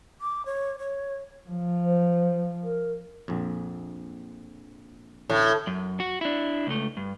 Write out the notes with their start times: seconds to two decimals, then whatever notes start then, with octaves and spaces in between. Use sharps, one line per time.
0.21 D6
0.46 C#5
0.79 C#5
1.50 F3
1.85 C5
2.64 A#4
3.28 A#1 F2
5.30 A1 D2 A2
5.67 F#2
6.00 F#4
6.21 D4 E4
6.67 C#2 A3
6.97 G2